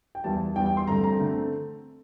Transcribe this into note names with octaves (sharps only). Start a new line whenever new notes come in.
G5
E2 E3 G3 A5
E2 E3 G3 G5
G5
C6
G2 D3 A3 C4 A#5
A#5
D3 A3 C4